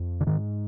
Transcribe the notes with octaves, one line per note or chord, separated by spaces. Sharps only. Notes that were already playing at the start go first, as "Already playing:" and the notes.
Already playing: F2
D3
G#2 D#3